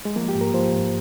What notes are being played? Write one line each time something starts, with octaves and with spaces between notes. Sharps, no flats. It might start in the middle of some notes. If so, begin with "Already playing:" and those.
G#3
F3 A#3
G4
G#2
A#4
F3 C5
G#2